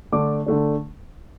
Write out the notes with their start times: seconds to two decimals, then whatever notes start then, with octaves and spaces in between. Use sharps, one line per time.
0.12 D3 A3 D4 D6
0.46 D3 A3 D4